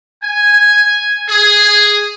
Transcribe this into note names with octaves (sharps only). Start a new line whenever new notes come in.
G#5
G#4